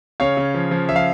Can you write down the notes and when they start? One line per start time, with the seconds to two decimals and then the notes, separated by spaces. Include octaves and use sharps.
0.20 C#3 C#5 F5
0.37 C#3
0.54 F3
0.71 F3
0.89 F3 E5
0.96 F5